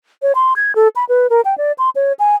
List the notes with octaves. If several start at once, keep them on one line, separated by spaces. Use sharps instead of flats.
C#5
C6
G#6
A4
B5
B4
A#4
G5
D5
C6
C#5
G#5